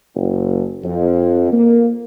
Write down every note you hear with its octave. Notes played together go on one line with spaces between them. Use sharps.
F#1
F2
A#3